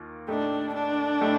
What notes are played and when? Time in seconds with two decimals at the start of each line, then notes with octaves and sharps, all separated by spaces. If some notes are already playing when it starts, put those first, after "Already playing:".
Already playing: D#2 D#3 A#3 F4
0.28 A2 A3 D4 D#4 G4
0.75 D4
1.21 A2 A3 D#4 G4